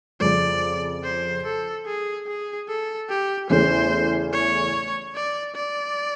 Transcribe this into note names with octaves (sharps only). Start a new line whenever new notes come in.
F2 C#3 F3 D5
C5
A4
G#4
G#4
A4
G4
E2 C#3 E3 A3 C#4 C5
C#5
D5
D5